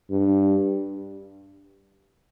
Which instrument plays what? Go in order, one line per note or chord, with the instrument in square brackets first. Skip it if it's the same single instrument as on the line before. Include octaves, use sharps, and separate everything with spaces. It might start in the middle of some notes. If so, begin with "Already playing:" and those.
[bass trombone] G2